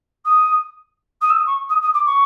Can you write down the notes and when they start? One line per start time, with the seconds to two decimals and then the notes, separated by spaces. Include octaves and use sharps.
0.25 D#6
1.21 D#6
1.29 E6
1.37 D#6
1.46 C#6
1.69 D#6
1.81 D#6
1.94 D6
2.05 C#6